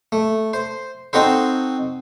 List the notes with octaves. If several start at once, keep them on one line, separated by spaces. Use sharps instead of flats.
A3
C5
C4 D#4 F#4 A4 C5